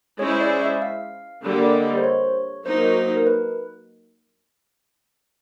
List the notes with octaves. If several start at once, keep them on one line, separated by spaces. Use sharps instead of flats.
G#3 C#4 E4 G#4 C5 C#5
D5
E5
F5
D3 G3 A#3
D5
D#5
C5
C#5
F#3 A#3 D#4 C5
A#4
B4